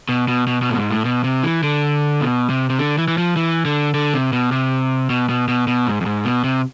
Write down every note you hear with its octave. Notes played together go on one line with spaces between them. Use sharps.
B2
B2
B2
B2
A2
G#2
A2
B2
C3
E3
D3
B2
C3
C3
D3
E3
E3
F3
E3
D3
D3
C3
B2
C3
B2
B2
B2
B2
G#2
F2
G#2
B2
C3